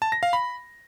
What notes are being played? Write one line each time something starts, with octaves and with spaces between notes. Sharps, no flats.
A5
A#6
F5
B5